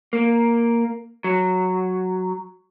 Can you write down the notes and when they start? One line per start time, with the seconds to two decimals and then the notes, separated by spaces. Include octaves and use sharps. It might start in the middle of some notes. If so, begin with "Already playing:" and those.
0.13 A#3
1.24 F#3